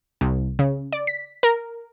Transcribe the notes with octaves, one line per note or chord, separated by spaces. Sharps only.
C2
C#3
D5
B6
A#4